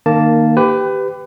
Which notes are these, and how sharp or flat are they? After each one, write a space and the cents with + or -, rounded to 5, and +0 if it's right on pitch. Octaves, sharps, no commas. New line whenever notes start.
D#3 -20 A#3 -5 A5 +0
G4 +0 B4 +25